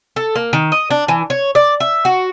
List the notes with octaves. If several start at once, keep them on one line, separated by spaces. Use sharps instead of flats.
A4
A#3
D#3
D#5
D4
E3
C#5
D5
E5
F#4